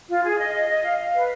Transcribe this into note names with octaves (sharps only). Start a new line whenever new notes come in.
F4
G#4
D#5
D#5
D#5
F5
F5
B4